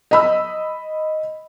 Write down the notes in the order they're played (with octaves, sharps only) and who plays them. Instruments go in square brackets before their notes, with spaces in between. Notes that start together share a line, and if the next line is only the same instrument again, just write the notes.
[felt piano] D#5 B5 E6